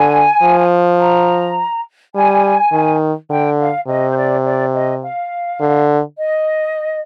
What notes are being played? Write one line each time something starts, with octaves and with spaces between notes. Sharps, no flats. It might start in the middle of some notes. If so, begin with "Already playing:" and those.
Already playing: D3 G#5
F3
A#5
G3 G#5
D#3
D3 G5
F5
C3 D#5
C5
D5
D5
D#5
F5
D3
D#5